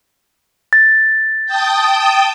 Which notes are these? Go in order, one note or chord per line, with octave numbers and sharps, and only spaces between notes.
A6
G5 A5 D#6